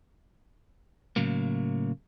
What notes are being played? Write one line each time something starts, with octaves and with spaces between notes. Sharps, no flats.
A2 C#3 F#3 A#3